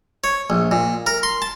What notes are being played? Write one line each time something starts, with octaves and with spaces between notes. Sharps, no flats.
C#5
A#1
A#2
A#4
C6
A5